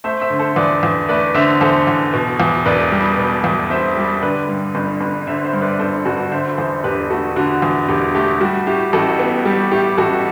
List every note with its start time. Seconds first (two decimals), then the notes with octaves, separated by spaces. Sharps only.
0.04 A3 C5 E5
0.21 C5 E5
0.30 D3
0.39 A4 C5
0.56 E2 B4 D5
0.83 E2
1.08 A3 B4 D5
1.34 D3 C5 E5
1.61 E2 A4 C5
1.87 E2
2.14 B2
2.40 E2
2.65 E1 B4 D5
2.92 G3
3.18 B2
3.44 E2
3.70 E1 C5 E5
3.96 G3
4.22 D3 B4 D5
4.49 G2
4.75 G1
5.01 G1
5.27 D3 C5 E5
5.44 C5 E5
5.53 G2
5.62 B4 D5
5.79 G1 A4 C5
6.05 G1 F#4 A4
6.31 D3 C5 E5
6.58 E2 A4 C5
6.84 E1 G4 B4
7.10 A3 F#4 A4
7.36 D3 F#4
7.62 E2
7.89 E1 G4
8.15 A3 G4
8.41 G3 F#4
8.67 A2 G4
8.93 A1 F#4 A4
9.19 B3
9.45 G3 G4
9.71 A2 G4
9.98 A1 F#4 A4